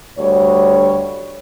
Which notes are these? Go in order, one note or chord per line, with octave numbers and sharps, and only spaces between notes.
D2 G3 C#5